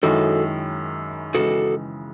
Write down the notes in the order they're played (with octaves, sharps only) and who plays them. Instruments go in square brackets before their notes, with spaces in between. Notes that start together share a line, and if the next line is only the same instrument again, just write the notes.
[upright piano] F#2 D#3 G#3 C#4 E4 [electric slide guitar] F#4 A4
[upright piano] C#3 E3 G#3 D#4 [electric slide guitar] F#4 A4